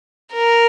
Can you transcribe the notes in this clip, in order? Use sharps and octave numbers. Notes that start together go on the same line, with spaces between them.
A#4